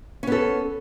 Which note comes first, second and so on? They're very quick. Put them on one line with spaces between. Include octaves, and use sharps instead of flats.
C#4 B3 A4